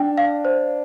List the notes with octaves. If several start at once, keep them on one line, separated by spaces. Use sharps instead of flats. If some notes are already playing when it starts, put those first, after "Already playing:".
Already playing: D4 G5
F5
C5